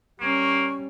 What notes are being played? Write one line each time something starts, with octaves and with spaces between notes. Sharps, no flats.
G3 A#3 C#4 C#6